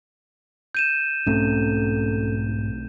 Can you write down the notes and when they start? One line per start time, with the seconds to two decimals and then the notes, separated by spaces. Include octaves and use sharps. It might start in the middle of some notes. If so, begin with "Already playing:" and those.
0.75 G6 D#7 E7
1.27 B1 G#2 A3 C4 C#4 A4